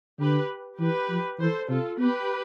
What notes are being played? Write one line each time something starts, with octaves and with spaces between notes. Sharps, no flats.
D3 G4 B4
E3 G4 B4
F3
E3 A4 C5
C3 F4 A4
B3 G4 B4